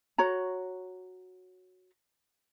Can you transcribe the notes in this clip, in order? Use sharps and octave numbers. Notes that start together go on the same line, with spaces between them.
F#4 C#5 A#5